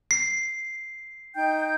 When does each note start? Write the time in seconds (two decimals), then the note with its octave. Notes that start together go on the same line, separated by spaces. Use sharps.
0.11 C7
1.35 D#4 G5 G6